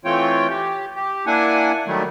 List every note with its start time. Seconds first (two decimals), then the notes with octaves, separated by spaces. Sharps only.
0.05 E3 A3 C4 F4 C#5 G5
0.50 G4
0.96 G4
1.26 A#3 D4 E4 F#5 G#5
1.87 D#3 F#3 G3 A3